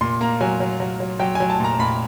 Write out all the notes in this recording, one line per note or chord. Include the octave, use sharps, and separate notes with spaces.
A#2 C6
A#3 A#5
F#3 G#5
F#3
F#3
F#3
F#3 G5
G#5
F#3
A5
A#2 A#5
A#2 B5